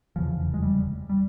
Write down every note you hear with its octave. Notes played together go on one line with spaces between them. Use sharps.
F1 E2 C#3 F3
G#3
G3
G3